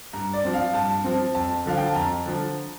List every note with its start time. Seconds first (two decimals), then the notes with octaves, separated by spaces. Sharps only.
0.13 G2 A#5
0.33 D5
0.44 F3 C4
0.54 F5
0.74 G2 A5
1.04 F3 C4
1.35 F2 A5
1.66 D3 F3 F5
1.77 G5
1.87 A5
1.95 F2 A#5
2.26 D3 F3